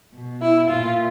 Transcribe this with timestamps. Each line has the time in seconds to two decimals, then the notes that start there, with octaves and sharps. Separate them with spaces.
0.14 B2
0.42 E4
0.70 A#2 F4